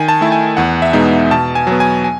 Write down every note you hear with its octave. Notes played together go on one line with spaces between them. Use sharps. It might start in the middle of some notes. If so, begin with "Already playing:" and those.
Already playing: D#3 G#5
A5
A3 E4
G#5
E2 F#5
E5
B2 G#3 B3 D#4
B2 A5
G#5
F#3 B3
G#5
G#5